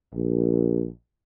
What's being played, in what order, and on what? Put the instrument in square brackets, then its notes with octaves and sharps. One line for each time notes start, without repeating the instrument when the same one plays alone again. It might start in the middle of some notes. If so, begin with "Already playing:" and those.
[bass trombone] A#1